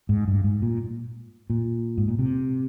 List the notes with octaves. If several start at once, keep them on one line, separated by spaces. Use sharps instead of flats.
G#2
G2
G#2
A#2
A#2
G#2
A#2
C3